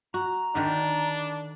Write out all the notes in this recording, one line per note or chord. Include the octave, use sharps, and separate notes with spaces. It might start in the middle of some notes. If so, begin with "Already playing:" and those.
F#4 A#5
D3 D#3 D4 B4